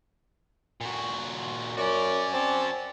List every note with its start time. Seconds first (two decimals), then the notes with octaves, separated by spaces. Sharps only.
0.81 A#2 F#4
1.77 F#2 C#4 F#4 D5
2.33 C4 D5 A5